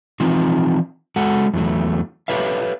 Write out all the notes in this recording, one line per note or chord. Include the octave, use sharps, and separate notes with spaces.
E3 F3 C4 D#4 F4
G#3 F#4 A4 F#5
E2 F#3 A3
G4 A4 B4 C#5 E5 F5